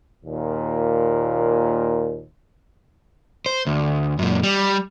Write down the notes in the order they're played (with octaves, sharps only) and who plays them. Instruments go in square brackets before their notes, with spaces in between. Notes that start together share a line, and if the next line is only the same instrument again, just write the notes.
[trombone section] D#2 A#2
[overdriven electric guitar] C5
D2
F#2 A#2
G3